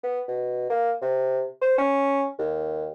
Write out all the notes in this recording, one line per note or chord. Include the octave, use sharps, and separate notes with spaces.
B3
B2
A#3
C3
C5
C#4
D#2